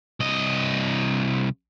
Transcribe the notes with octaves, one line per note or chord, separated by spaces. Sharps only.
C2 D#5